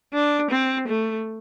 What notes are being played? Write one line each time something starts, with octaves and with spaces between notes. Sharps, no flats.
D4
C4
A3